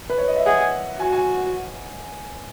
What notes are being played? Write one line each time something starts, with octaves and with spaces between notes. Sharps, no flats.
B4
C#5
D#5
E5
G#4 F#5
F#4 G#5
G#5